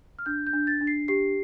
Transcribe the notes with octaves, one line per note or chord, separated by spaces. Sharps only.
F6
D4 G6
G6
D4
A6
D4
C7
G4 C7